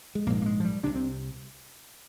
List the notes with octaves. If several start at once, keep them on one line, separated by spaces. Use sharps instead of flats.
G#3
A#1 G#2 A#3
A#3
G#3
F3
G3
C2 C3 D4
C4